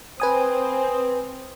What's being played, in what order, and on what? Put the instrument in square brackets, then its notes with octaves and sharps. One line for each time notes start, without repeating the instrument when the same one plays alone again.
[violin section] C4 [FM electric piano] B4 G#5 D#6